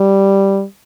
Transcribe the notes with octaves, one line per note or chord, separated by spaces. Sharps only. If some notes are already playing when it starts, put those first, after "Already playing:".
Already playing: G3